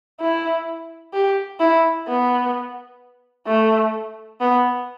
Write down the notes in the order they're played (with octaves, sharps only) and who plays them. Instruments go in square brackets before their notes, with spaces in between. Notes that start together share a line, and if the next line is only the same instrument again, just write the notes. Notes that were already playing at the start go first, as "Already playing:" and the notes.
[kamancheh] E4
G4
E4
B3
A3
B3